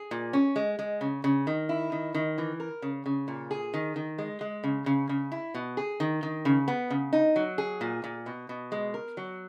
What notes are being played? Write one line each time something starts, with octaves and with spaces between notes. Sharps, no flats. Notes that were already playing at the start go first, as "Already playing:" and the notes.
Already playing: G#4
A#2
C#4
G#3
G#3
C#3
C#3
D#3
E4
D#3
D#3
E3
A#4
C#3
C#3
A#2
G#4
D#3
D#3
G#3
G#3
C#3
C#3
C#3
E4
B2
G#4
D#3
D#3
C#3
B3
C#3
D#4
F#3
G#4
A#2
A#2
B2
B2
G#3
A#4
F#3